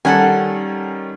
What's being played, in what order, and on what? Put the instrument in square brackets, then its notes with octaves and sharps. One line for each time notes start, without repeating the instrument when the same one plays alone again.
[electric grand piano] D#3 G3 C#4 [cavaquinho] A4 F#5 G#5